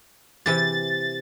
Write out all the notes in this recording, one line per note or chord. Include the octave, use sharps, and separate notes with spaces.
C3 E3 G4 A6